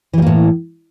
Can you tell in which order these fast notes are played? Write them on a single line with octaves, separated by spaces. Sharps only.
E3 G3 A#3 A2